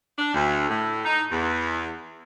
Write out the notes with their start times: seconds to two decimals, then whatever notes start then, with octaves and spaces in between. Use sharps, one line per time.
0.17 D4
0.34 D2
0.69 A2
1.05 D#4
1.31 E2